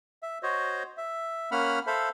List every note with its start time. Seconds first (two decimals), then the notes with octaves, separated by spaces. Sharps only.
0.23 E5
0.43 F#4 C5 C#5 D#5
0.97 E5
1.52 A#3 C#4 F#5 B5 F6
1.87 A4 C5 E5 F5 B5